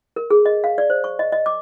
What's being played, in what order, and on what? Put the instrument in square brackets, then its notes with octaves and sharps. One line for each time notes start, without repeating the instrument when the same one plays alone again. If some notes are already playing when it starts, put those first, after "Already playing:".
[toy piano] A#4
G#4
D#5
F5
D5
C5
C#6
D#5
D#5
D6